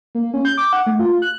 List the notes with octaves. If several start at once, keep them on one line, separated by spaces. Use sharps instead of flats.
A#3
C#4
G6
D6
F#5
A3
F4
F#6